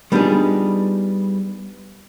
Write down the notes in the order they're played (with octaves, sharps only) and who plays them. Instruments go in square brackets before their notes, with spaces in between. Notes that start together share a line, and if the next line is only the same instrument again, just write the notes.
[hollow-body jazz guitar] G3 B3 D4 D#4 F4 G#4